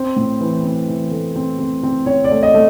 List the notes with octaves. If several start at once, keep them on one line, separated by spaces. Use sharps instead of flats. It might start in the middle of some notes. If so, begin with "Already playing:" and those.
Already playing: C4 C5
A2
E3
C4
E3
A3
C4
C4
C4
C4 C#5
D5
A3
D#5
A3